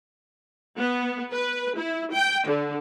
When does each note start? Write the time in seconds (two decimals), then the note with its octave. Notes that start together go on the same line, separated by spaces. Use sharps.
0.78 B3
1.33 B4
1.78 E4
2.13 G5
2.48 D3